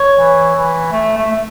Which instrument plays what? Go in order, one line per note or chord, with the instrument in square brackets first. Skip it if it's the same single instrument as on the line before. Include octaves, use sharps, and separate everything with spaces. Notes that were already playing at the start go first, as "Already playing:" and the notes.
Already playing: [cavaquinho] C#5
[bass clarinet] E3
E3
A3
A3
A3